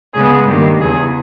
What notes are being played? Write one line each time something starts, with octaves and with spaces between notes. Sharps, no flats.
C#3 G#3 B3 G#4
G2 D#3 A#3 G4
E2 C#3 E3 G#4